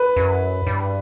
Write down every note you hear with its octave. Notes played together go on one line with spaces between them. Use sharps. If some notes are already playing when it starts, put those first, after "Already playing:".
Already playing: B4
F#2
G2